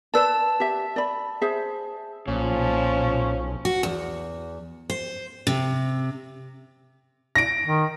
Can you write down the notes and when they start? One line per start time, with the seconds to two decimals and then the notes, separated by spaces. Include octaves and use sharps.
0.14 B4 D5 A5 E6
0.60 G4 E5
0.96 D5 B5
1.41 G#4 C5 E5
2.28 B1 A#2 F3 C#4
3.65 F#4
3.83 E2
4.90 C5
5.47 C3
7.35 A#6 D7
7.66 D#3